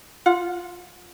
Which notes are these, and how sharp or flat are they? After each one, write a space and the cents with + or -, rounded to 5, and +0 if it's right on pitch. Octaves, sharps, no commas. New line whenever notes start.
F4 +0 F#5 -30